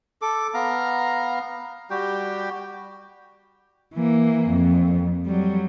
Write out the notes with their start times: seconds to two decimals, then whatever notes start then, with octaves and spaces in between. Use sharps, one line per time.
0.22 A4 D6
0.54 B3 F5 A#5
1.91 G3 F#4 G4 G5
3.94 E3 A#3
4.50 F2
5.26 F#3 G3